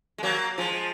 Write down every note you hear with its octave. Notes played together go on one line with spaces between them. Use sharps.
G#3
F#3 A#3
F3 G#3